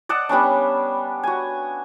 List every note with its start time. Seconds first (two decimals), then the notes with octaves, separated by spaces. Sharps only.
0.09 D5 D#5 F#5 A5
0.29 G3 B3 C#4 D4
1.23 F#4 G#5